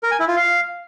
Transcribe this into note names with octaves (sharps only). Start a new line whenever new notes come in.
A#4
G#5
E4
F4
F5